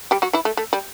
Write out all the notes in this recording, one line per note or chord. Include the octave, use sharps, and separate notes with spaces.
G3 G4
F#3 F#4
E3 E4
A3
A3
G3